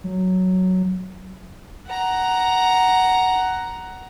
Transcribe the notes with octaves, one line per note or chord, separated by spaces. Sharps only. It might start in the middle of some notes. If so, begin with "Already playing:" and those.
F#3
F#5 A#5